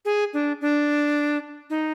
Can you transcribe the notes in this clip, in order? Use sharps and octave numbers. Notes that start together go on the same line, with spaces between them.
G#4
D4
D4
D#4